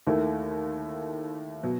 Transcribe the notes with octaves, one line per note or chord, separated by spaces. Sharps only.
D#2 D#3 A3 E4
B2 F#3